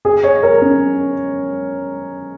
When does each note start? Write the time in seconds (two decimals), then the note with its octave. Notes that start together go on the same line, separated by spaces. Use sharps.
0.05 G#4
0.23 C#5
0.43 A#4
0.61 C#4